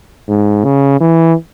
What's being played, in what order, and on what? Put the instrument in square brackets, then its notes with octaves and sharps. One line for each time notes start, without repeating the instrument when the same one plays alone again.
[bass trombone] G#2
C#3
E3